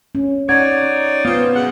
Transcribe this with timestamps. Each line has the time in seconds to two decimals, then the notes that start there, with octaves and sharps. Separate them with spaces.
0.15 C#4
0.49 C#4 D#4 C#5 D5 F#5 G#6
1.25 B3 C4 D#4 F4
1.55 F#2 G#3 F#5